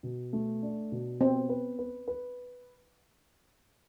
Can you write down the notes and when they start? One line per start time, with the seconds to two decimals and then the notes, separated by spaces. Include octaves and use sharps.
0.03 B2
0.33 A3
0.63 D4
0.92 B2
1.21 B3 C4
1.49 B4
1.79 B4
2.08 B4